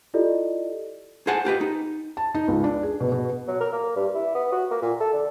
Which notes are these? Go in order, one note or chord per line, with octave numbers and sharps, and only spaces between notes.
E4 F4 G4 A4 D5 D#5
G#4 C5 F5 F#5 G#5 A5
F4 G4 B4 D#5
D#4
A5
D#4
C#2
D4
G#4
B2
B2
F#3
A#4
A#3
G2
E4
B3
F#4
A#3
A#2
A4
D3